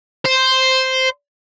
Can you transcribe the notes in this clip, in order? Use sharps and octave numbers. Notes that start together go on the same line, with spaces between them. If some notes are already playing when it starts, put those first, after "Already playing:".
C5